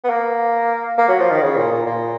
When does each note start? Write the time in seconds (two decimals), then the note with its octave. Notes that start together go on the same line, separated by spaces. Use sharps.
0.04 B3
0.10 A#3
0.98 A#3
1.08 F#3
1.19 F3
1.31 D#3
1.42 C#3
1.57 A#2
1.72 A#2
1.86 A#2